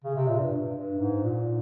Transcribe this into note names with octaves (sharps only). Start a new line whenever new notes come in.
C#3
C3
A#2
G2
G2
G#2
A#2